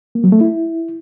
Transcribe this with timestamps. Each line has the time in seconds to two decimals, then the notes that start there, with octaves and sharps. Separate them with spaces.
0.15 A#3
0.24 F#3
0.32 A3
0.41 E4